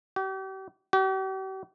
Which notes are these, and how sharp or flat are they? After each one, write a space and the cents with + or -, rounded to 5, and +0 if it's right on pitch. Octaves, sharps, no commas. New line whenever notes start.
G4 -40
G4 -45